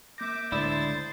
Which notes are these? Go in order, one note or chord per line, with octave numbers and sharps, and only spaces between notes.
A#3 E5 D6 G6 A#6
C#2 A2 D3 E4 C5 D5 D#6 A6